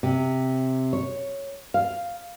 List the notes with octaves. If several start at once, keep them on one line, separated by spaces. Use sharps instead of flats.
C3
C#5
F5